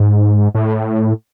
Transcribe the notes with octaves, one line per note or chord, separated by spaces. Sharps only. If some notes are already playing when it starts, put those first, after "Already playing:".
Already playing: G#2
A2